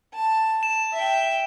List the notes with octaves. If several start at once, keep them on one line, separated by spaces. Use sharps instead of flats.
A5
E7
E5 G5